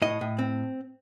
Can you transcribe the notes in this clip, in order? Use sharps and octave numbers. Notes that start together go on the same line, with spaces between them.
A2 D#5
A2
C4